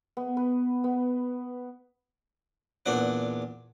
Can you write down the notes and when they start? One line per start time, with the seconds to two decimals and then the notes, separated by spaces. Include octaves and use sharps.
0.17 B3
0.37 B4
0.84 B3
2.86 E2 A#2 D4 F#5